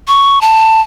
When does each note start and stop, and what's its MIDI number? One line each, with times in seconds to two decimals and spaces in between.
0.08 0.39 85
0.41 0.81 81